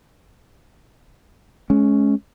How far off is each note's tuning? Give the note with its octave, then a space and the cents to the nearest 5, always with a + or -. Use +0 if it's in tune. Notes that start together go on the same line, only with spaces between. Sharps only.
G#3 +30 C#4 +0